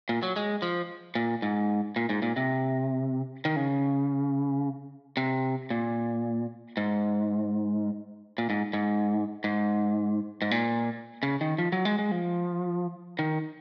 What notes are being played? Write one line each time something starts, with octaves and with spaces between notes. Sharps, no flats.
A#2
F#3
G#3
F3
A#2
G#2
A#2
G#2
A#2
C3
D#3
C#3
C3
A#2
G#2
A#2
G#2
G#2
G#2
G#2
A#2
C#3
D#3
F3
F#3
G#3
G#3
F3
D#3